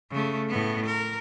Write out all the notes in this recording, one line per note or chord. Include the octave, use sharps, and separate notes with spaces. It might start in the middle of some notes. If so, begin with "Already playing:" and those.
C#3 A3
A2 B3
A#4